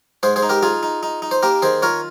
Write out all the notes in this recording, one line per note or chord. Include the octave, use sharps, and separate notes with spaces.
G#2 G#4 C5
G#4 C5
D#4
G4 A#4
D#4 F4 G#4
D#4
D#4
D#4
C5
A#3 G4 A#4
D#3 G#4 C5
F4 A#4 C#5